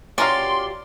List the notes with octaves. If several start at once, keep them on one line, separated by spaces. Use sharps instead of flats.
B2 C#4 F4 G4 A#4 D5 F5 C6